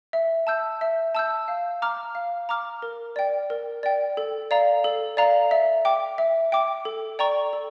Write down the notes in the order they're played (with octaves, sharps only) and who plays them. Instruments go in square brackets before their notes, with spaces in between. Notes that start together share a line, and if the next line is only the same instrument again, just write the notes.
[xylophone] E5
A5 E6 G6
E5
A5 E6 G6
F5
A#5 D6 F6
F5
A#5 D6 F6
A#4
D5 G5
A#4
D5 G5
A4
D5 F5 A#5
A4
D5 F5 A#5
E5
G5 D6
E5
G5 D6
A4
D5 G5 A#5 C#6
A4